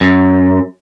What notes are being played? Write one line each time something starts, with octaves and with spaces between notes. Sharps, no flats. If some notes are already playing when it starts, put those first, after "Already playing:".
F#2